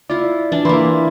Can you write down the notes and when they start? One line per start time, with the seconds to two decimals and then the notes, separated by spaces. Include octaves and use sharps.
0.10 E4 F4 D5
0.52 E3 D4
0.65 E3 A#3 E4 B5 C6